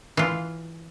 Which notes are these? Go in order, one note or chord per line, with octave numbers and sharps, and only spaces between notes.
E3 F4